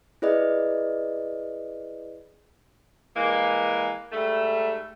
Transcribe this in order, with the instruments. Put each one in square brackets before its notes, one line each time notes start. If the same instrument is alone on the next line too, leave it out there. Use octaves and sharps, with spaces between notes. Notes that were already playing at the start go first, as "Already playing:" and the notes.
[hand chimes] E4 G#4 B4 D5 D#5
[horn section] E3 G3 G#3 A#3
G#2 G3 A3